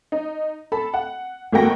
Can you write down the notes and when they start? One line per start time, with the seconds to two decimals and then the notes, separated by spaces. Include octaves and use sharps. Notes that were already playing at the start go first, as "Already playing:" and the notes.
0.12 D#4
0.72 A4 A5 B5
0.94 F#5
1.52 G#1 A3 A#3 F#4 G5 A#6